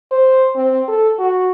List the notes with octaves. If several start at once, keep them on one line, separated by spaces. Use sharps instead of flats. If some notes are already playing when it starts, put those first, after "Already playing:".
C5
C4
A4
F#4